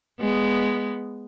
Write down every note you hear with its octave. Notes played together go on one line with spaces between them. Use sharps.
G#3 B3